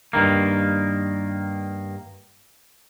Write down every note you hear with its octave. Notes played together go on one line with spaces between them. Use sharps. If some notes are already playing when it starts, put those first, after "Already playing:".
G2 D#3 A#3